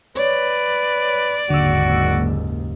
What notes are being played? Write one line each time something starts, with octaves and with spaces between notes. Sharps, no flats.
B4 C#5 D5
F#1 D#2 G#2 D3 F#4 E6